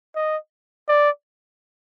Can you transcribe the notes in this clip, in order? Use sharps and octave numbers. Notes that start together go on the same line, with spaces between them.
D#5
D5